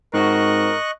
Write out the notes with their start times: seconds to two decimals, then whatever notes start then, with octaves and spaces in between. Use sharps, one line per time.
0.14 G#2 C4 F#4 A#4 D#5 C#6 F#6